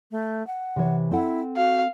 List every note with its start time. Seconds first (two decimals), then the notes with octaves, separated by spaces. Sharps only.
0.11 A3
0.47 F#5
0.76 C3 E3 C#5
1.11 C4 E4 A4 F#5
1.56 F#4 F5